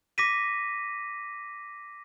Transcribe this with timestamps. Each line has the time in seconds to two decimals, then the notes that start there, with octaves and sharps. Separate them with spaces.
0.18 D6 A#6 B6 D#7